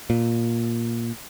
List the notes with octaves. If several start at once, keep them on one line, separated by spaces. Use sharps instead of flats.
A#2